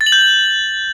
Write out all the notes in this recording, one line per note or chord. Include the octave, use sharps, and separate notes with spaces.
A6
F#7
G6